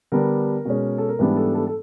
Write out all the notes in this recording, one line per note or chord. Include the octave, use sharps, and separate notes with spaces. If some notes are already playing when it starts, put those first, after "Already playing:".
D3 G3 B3 D4 A#4
B2 G#3 C#4
A4
A#4
G#2 E3 G3 B3 D4 B4
A4
A4
A4